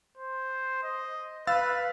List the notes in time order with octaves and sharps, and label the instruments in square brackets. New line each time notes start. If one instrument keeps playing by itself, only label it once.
[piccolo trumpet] C5
D#5
[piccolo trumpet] B4 [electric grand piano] F5 E6 A6